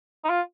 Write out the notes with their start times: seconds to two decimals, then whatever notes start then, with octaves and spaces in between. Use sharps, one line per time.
0.24 D#4
0.30 F4